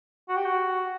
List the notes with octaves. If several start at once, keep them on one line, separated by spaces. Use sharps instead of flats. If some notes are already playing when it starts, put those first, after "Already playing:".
F#4
G4
F#4